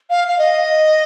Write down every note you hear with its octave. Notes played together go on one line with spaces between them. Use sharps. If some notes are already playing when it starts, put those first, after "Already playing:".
F5
F5
D#5